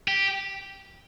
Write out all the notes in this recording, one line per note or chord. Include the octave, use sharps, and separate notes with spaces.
G4